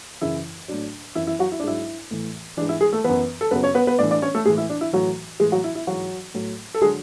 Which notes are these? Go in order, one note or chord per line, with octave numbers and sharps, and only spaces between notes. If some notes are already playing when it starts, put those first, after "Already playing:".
F#2 C#3 E3 E4
A2 F#3 D4
F#2 E3 E4
E4
F#3 F#4
E4
D4
G#2 F#3 E4
A2 E3
G#2 E3 D4
E4
G#3 G#4
A3 A4
F#2 E3 B3 B4
A4
F#2 C#3 F#3 B3 B4
C#4 C#5
B3 B4
B3 B4
A2 E3 D4 D5
D4 D5
C#4 C#5
A3 A4
A2 E3 G#3 G#4
E4
D4
E4
A2 E3 F#3 F#4
A2 E3 G#3 G#4
F#3 F#4
E4
E4
G#2 E3 F#3 F#4
A2 F#3
A4
D3 F#3 G#3 G#4